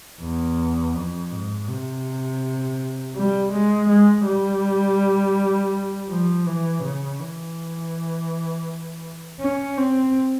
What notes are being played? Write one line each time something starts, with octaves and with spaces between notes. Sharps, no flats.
E2
F2
G#2
C3
G3
G#3
G#3
G3
F3
E3
C#3
E3
C#4
C4